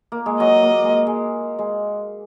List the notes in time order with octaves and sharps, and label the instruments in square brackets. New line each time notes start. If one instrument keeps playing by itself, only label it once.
[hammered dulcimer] A#3
G#3
[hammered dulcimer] F#3 [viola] D#5
[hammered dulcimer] A#3
G#3
G#3
G#3